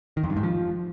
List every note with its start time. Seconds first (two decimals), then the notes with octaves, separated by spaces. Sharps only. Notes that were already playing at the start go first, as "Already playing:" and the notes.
0.17 D#3
0.23 F2
0.30 G2
0.37 G#2
0.43 F3